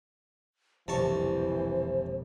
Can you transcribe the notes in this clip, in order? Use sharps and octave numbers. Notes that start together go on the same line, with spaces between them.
E1 C2 F2 D3 E3 C5 A5 C#6